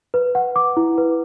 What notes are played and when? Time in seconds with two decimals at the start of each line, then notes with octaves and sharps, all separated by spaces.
0.14 B4
0.35 F#5
0.56 D6
0.77 E4
0.98 B4